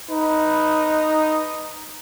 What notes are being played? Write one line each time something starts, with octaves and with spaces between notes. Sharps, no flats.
D#4 B4